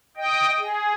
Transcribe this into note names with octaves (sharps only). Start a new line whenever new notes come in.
D#5 G5
G#4